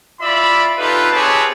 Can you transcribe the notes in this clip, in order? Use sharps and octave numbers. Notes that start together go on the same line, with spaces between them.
E4 F4 D5 E5 B5
D#4 F4 G4 A4 B4
C4 G4 G#4 B4 C#5 A5